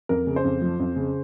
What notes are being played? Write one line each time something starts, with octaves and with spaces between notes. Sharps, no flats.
F2 A#4
C#3
C5
F2
F3
F2
C#3